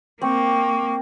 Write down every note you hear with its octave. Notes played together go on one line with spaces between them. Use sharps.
A#3 C4 C#6 D6